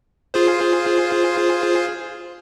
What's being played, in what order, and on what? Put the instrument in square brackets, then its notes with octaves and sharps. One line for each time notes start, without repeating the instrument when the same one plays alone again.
[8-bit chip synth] F4 G#4 C5